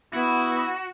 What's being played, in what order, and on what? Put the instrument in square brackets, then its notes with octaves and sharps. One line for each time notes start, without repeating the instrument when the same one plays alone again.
[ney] B3 [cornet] E4 [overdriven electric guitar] F#4